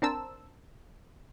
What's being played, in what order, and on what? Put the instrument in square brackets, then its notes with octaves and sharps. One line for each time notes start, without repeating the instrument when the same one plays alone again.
[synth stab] C4 D4 A#4 C5 A5 E6